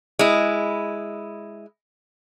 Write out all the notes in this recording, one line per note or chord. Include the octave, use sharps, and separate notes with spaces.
G#3 E4